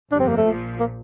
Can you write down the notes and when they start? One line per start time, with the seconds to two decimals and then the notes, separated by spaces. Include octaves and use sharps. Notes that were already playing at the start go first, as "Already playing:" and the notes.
0.12 G1 F2 C3 D4
0.20 C4
0.28 A#3
0.37 A3
0.46 A#1 A#2 F3
0.80 A#3